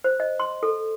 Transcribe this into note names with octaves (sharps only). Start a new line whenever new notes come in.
C5
D#5
C6
A4